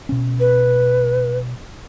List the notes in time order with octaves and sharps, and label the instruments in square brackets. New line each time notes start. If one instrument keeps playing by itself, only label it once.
[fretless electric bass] B2 C#4
[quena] B4